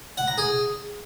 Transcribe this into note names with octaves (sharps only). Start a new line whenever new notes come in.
F#5
A#5
G#4